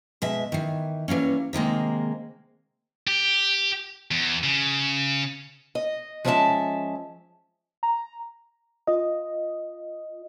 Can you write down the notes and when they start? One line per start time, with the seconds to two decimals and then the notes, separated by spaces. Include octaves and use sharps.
0.22 B2 G#3 E5
0.52 D#3 E3
1.08 E3 G3 A#3 C#4
1.53 C3 D#3 G#3 A#3
3.07 G4
4.11 E2
4.43 C#3
5.75 D#5
6.25 F3 G#3 B3 C#4 E5 A5
7.83 A#5
8.87 F4 D#5